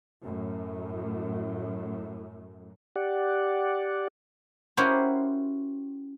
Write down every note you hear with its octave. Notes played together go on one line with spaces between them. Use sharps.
F#2 A2
G4 D5 F#5
C#4 E4 F#4 G4 A#4 C5